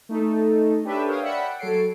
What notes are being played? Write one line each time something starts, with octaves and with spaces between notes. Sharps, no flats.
A3 D#4 A4
D4 G4 A4 B4 C#5 E5
A#4 C#5 F5 G5 D#6
D5 E5 F#5 G5 B5 C#7
F#3 A4 C#5 C7 D7